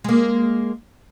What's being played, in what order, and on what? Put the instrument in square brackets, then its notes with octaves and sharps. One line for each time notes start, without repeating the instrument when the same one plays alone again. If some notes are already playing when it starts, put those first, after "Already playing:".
[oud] G#3 A#3